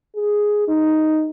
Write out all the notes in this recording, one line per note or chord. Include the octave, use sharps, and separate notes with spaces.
G#4
D#4